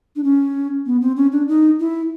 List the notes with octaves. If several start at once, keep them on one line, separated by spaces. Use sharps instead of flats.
D4
C#4
B3
C4
C#4
D4
D#4
E4